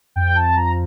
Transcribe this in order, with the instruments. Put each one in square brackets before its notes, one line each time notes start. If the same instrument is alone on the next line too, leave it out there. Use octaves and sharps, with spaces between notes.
[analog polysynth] F2 G5
A5
F3 A#5